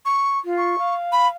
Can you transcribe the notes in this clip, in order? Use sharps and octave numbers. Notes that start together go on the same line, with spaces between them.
C#6
F4
C#6
F5
B5